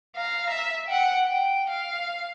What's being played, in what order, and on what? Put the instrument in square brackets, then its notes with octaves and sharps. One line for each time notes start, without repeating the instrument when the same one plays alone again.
[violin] F5 A#5
E5
F#5 G5
G5
F5